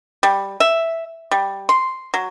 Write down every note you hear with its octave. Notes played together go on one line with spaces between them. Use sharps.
G3
E5
G3
C6
F#3